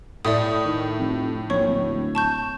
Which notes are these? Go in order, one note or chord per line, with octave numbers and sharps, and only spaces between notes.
A2 D5 E5 D#6
D#3
F1
A#1 C#5 C#6
D1
A5 C#6 G6